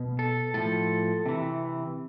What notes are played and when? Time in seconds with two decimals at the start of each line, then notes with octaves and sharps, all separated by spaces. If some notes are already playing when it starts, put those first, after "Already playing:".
Already playing: B2
0.19 A4
0.54 A2 F3 A4
1.26 C3 E3